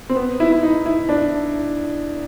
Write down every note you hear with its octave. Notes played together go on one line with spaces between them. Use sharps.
C4
B3
E4
E4
D#4
E4
D4